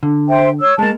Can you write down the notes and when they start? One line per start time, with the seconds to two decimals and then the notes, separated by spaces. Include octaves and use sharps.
0.03 D3
0.29 C5 E5 G5
0.60 C#5 E6
0.79 G#3 A#3 A5